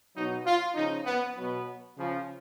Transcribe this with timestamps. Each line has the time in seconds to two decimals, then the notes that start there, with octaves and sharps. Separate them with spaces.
0.15 B2 F#3 D#4
0.45 F4
0.75 C#3 F3 D#4
1.05 B3
1.35 B2 F#3 B3
1.96 C#3 F3